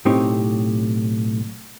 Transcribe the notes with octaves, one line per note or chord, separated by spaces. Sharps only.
B1 A2 C4 D#4 G4 C#5